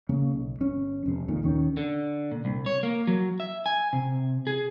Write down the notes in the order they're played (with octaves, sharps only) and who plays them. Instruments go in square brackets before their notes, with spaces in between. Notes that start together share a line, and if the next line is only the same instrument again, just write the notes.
[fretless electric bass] C#3 A#3 C#4
B1
G1 C#4
F1 C3
F1 B1 A#2 D#3
D#2 D#3 C#4
[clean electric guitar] D3
A#2
C2
C#5
A#3
F#3
E5
G#5
C3
G#4